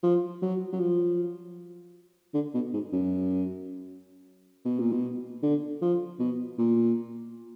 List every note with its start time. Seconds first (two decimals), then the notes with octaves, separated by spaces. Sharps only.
0.03 F3
0.42 F#3
0.73 F#3
0.80 F3
2.34 D3
2.54 B2
2.73 G#2
2.93 F#2
4.65 B2
4.79 A#2
4.92 B2
5.43 D3
5.82 F3
6.19 B2
6.58 A#2